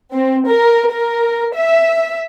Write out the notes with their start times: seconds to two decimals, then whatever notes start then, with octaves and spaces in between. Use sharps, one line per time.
0.12 C4
0.47 A#4
0.89 A#4
1.54 E5